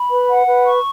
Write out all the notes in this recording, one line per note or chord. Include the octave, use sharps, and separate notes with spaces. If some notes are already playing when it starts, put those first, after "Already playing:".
Already playing: B5
B4
F#5
B4
C#6